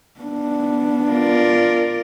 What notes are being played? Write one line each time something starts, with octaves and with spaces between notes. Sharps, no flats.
B3 D4
F4 A#4 D5